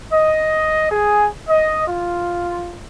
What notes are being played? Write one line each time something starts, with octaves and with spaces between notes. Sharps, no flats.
D#5
G#4
D#5
F4